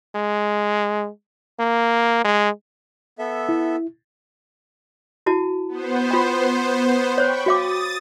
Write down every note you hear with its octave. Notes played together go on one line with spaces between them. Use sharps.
G#3
A#3
G#3
B3 A4 E5
E4
E4 F#4 A5
B3 C5
F4 G5
C5 C#5 G5 B5 C#6
F#4 F5 D6 D#6 A6